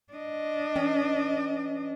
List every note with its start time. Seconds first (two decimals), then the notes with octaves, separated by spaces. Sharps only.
0.13 D4 D#5
0.75 E3 C#4 G5